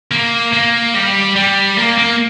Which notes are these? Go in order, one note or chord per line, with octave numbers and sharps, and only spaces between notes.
A#3
A#3
G3
G3
A#3
A#3